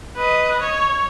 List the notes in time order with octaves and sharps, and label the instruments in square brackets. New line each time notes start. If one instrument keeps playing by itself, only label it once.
[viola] B4 D#5
C#5